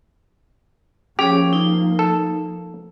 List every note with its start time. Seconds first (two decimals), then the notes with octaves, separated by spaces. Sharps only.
1.19 F3 A#3 C#4 G4 G#4 C#5
1.53 D#4
1.99 A4